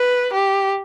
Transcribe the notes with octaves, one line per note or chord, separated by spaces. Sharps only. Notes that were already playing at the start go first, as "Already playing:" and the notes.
Already playing: B4
G4